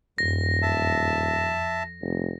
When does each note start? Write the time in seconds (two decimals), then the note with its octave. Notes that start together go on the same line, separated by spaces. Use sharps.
0.18 D#1 F#2 A#6
0.62 F2 E5 A5
2.02 F1